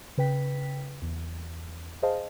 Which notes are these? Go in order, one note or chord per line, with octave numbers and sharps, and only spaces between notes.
C#3 B4 G5 B6
E2
G#4 C5 D#5 F5 A5